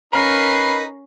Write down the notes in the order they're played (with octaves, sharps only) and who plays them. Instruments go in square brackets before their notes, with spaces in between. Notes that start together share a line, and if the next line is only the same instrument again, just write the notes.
[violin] C#4 C7 [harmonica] D#4 B4 [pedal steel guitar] A#4 F5 B5